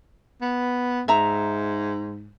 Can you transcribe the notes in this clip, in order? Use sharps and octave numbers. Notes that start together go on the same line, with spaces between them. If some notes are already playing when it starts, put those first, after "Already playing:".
B3
G#2 E5 A#5